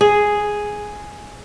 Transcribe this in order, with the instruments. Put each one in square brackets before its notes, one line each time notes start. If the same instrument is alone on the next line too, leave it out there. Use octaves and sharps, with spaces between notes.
[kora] G#4